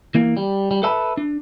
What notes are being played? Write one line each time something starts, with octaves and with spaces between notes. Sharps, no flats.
E3 A#3
G3
G3
A4 B4 E5 A5 B5
D4